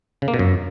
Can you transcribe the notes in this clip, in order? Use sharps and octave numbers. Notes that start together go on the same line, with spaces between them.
C#3
A#3
B2
F#2